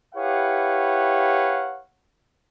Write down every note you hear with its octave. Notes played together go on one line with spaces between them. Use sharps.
E4 G4 B4 C#5 F5 F#5